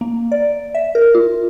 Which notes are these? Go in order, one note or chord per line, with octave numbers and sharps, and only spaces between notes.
A#3
D5
E5
A#4
F4